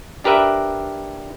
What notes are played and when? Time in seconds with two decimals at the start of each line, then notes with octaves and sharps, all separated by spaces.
0.24 D4 G4 A#4 B4 E5